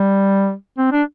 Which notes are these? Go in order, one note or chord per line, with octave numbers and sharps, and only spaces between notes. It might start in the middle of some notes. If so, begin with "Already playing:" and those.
Already playing: G3
C4
D4